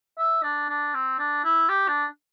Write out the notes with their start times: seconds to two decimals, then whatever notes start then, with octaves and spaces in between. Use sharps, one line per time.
0.18 E5
0.43 D4
0.69 D4
0.94 C4
1.19 D4
1.44 E4
1.69 G4
1.88 D4